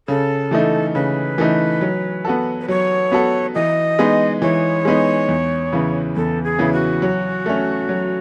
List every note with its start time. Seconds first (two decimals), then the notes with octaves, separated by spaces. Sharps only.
0.08 C#3 A4
0.51 E3 A3 D#4
0.94 C#3 B4
1.38 E3 A3 D#4
1.81 F#3
2.25 B3 F#4 A4
2.61 B4
2.68 F#3 C#5
3.12 B3 F#4 A4
3.55 E3 D#5
3.99 G#3 B3 D#4
4.42 E3 C#5
4.85 G#3 B3 D#4
5.28 E2
5.73 C#3 E3 B3
6.16 E2 A4
6.44 G#4
6.59 C#3 E3 B3
6.73 F#4
7.02 F#3
7.46 A3 C#4
7.89 F#3